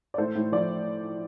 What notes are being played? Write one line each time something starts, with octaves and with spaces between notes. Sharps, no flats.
D5
A2 A4 C5
A2
F3 D5